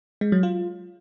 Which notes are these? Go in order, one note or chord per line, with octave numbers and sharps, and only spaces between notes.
G#3
F#3
F4